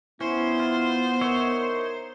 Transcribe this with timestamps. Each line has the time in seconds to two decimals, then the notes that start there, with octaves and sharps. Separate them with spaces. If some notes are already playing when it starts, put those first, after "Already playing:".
0.21 B3 C#4 E4 C5
0.60 F4
1.21 D#4 A#4 C#5 E5